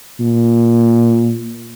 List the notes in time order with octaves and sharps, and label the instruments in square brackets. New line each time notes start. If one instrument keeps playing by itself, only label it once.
[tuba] A#2